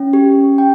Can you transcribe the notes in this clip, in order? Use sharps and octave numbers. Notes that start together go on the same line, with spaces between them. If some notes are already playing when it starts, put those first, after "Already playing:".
Already playing: C#4
G4
G5